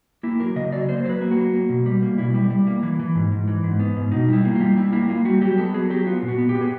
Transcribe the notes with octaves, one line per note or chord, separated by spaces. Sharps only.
A#3 E4
F#3 A#4
C#3 D#5
F#3 D5
A#3 C5
F#3 C5
B4
A#3
F#4
F#3
A#3
B2
G3
A#3
B2 E4
G3
G3
A#3
E3
E3
G#2
G#2
E3
G#2
B3
G#2
B2 D#4
G3 E4
A#3
F4
G3
G3 E4
A#3 E4
A#3 F4
G3 F#4
F#3 G4
B3 A4
F#3 G#4
F#3 G4
B3 F4
A#2
F#4
B3
G4
B3
G#4